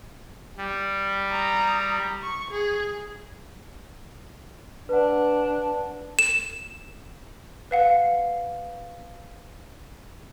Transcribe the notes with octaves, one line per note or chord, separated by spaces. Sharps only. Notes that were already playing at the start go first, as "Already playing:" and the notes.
G3
A#5 D#6
C#6
G#4
D4 B4 F#5
E7
B4 F5 F#5